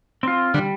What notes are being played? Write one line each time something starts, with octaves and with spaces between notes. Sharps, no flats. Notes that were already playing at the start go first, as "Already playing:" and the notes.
C4 F4
D3 G3